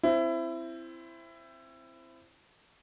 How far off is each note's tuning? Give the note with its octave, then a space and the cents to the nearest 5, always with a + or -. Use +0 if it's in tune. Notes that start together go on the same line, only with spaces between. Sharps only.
C4 +5 E4 +20